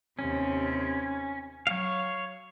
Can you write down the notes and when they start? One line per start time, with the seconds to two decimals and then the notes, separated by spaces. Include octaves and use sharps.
0.19 D#2 C3 C#4
1.67 F#3 C#5 F5